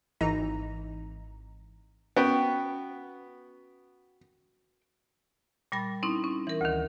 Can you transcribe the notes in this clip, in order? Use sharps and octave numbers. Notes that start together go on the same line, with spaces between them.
G#1 E3 D#4 A#5
B3 C#4 F#4 G5
A#2 G3 B5 A6
C4 C#4 D#4 E4
C#4
E3 A#4
D2 D#3